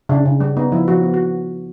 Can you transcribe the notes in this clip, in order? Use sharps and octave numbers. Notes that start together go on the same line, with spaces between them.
C#3 D4
C#3
G3
B3 D#4
F3 E4
F3 F#4
B3
F#4